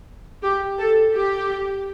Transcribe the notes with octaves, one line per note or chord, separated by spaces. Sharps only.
G4
A4
G4